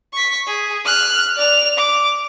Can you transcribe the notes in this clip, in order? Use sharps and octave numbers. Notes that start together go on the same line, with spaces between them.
C#6 B6
G#4
F6 F#6
D5 F7
D6